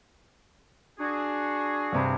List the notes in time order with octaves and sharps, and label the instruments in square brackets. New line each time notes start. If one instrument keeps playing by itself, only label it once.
[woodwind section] D4 F#4 G#4
[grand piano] G2 C3 B5